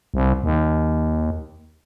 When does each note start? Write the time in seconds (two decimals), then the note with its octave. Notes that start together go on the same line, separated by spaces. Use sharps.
0.14 C2
0.44 D#2